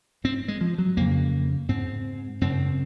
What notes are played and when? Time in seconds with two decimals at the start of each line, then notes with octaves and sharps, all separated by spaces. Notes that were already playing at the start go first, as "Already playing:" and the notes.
0.24 G#2 C4
0.48 G#3
0.61 F3
0.78 F#3
0.97 F2 C#3 A#3
1.69 G#2 C4
2.41 F#2 C#3 C4